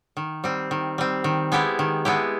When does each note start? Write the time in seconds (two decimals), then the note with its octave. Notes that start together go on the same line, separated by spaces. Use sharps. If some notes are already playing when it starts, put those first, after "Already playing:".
0.17 D#3
0.44 G3 C4
0.71 D#3
0.98 G3 C4
1.24 D#3
1.52 G#3 B3 E4 G4
1.79 D#3
2.05 G#3 B3 E4 G4